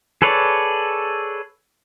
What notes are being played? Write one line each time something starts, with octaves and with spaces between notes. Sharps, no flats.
G#4 A4 B4 C#5 D5